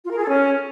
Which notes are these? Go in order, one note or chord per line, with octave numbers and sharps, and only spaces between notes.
F4
A#4
G#4
A4
C#4